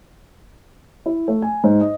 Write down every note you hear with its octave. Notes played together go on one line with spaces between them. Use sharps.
E4
A3
G#5
G#2
D#5